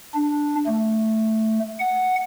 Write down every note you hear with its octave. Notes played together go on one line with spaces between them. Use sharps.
D4
A3
F#5